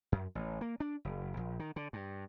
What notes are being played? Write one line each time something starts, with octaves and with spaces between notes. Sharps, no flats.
F#2
A1
A#3
D4
F#1
A#1
D#3
D3
G2